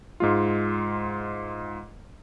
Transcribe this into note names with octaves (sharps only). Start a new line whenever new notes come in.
G#2 G#3 F4